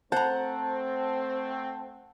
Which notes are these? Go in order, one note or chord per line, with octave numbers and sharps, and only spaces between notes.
A3 C4 C5 F#5 A5 A#5